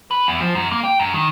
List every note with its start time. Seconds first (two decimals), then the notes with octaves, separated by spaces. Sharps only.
0.11 B4
0.27 E2
0.40 F3
0.55 F#2
0.71 A#3
0.84 G5
1.00 F#2
1.14 D#3